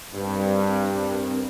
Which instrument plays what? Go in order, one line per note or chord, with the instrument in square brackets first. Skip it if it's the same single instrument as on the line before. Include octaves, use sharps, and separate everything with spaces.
[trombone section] G2 [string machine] C4 D4 A#4